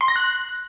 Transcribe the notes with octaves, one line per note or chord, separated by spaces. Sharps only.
C6
A#6
F#6